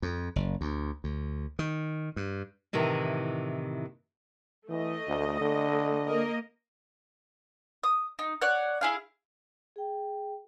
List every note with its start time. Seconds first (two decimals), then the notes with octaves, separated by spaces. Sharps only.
0.02 F2
0.36 F#1
0.61 D2
1.04 D2
1.59 D#3
2.16 G2
2.73 A2 C3 D#3 E3 E4
4.69 E3 A3 D#5
5.07 D2
5.41 D3
6.07 A#3 A#4 D#5
7.84 D#6
8.19 D#4
8.42 C#5 D5 F#5 F#6
8.81 E4 G#4 F5
9.76 G#4 G5